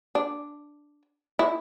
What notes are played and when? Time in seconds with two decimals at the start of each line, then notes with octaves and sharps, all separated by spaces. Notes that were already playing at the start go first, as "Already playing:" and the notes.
0.15 D4
1.39 E4